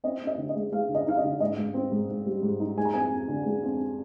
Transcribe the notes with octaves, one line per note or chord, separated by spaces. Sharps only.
C4 D#5
C4
D#5
D3
D#5
G#3
G#3 F5
D3
D#5
D#4 F5
D#5
D3
G#2 D#5
G#2
C4
G#2
G#2
G3
G#2
D#4
G#3 G#5
A#5
F2 G#5
F2
D3
G#3
F2